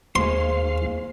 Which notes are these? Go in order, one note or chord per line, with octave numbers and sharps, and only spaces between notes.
D#2 G#4 C5 F5 C6